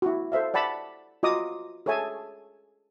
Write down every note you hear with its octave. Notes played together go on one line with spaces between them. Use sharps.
E4 F#4
A4 C5 E5 F5
D5 F#5 A5 B5
F4 F#4 D#5 A#5 D6 D#6
G#4 A4 C#5 E5 G#5 A5